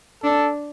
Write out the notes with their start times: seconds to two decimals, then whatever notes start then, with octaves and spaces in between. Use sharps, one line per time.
0.23 D4 A4